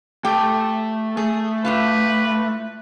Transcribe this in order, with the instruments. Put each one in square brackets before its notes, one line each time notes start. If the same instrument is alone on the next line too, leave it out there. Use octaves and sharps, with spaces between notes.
[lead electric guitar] A3 A5 [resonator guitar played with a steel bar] G4 G5
[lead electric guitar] A3 [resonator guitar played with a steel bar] G#4
[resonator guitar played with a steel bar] A2 D4 F4 [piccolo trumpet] B4